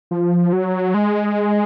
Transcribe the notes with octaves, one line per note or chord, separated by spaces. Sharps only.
F3
F#3
G#3